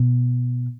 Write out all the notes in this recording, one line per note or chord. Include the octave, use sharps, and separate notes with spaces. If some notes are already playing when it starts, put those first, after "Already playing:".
Already playing: B2